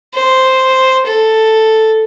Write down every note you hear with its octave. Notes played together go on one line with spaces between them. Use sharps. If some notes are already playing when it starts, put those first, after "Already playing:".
C5
A4